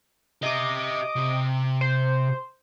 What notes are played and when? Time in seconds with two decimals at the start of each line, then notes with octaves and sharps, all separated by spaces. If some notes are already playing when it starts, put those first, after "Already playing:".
0.43 G4 D#5 E5 D6
1.16 C3
1.81 C5